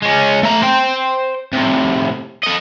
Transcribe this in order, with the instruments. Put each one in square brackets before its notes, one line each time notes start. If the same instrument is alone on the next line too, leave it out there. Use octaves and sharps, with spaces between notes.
[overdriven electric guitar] G#3 C#4
A3 A#5
C5 G5
A2 C3
A4 D#5